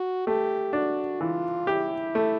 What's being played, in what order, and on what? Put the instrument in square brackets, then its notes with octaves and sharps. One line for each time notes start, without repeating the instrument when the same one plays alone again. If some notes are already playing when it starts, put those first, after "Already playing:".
Already playing: [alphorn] F#4
[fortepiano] A3 [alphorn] G4
[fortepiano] D4 [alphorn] F#4
[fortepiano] E3 [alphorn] F4
[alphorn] E4 [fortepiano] G4
[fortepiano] A3